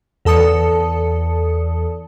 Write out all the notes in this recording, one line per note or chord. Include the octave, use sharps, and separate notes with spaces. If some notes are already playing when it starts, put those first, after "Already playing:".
E2 A4 A5 D#6 C#7